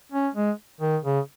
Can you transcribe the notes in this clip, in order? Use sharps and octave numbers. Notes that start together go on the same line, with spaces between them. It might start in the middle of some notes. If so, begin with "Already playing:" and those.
C#4
G#3
D#3
C#3